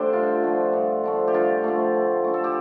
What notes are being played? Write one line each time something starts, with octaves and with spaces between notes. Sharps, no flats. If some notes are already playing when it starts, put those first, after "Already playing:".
Already playing: D3 A3 D4 G4 A4 C5 D5
G2 F4
D3 F3 A3
G2
D3 F3 A3
G4
G2 F4
D3 F3 A3
A2
A3 D4
A4
G4